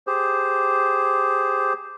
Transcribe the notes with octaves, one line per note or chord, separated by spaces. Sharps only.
G4 G#4 C5